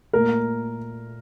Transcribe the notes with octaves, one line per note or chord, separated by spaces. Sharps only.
A#2 A3 A#4